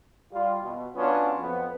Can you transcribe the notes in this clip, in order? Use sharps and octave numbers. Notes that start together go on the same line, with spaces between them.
G3 F4
B2
F#3 B3 C#4 D4 F4
F2 B3